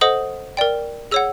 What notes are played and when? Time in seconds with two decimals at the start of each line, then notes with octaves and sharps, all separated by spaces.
0.01 A4 C5 D#5 F#5 D#6
0.57 A#4 D5 G5
1.11 G#4 C#5 F#5 E6